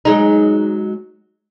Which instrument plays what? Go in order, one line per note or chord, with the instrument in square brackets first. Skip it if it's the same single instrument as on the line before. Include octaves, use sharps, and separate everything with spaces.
[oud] F#3 G#3 D#4